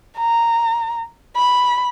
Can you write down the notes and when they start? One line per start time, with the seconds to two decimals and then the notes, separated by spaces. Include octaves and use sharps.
0.19 A#5
1.36 B5